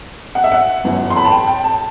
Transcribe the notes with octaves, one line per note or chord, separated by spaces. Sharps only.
F#5
E5
F#5
G1 F#2 E3
C6
B5
A5
G5
G5
A5